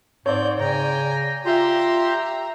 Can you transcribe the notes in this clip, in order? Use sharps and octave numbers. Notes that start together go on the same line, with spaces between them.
G#2 C4 C#5 D5 G6
C#3 G5 G#5 A#5
F4 G4 E5 A#5 C6